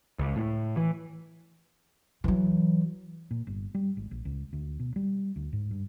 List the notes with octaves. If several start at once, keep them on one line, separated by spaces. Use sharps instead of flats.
C#2
A2
E3
E3 F#3
A#2
G1
G3
G#1
A#1
C#2
D2
B2
G3
D2
G#2
G2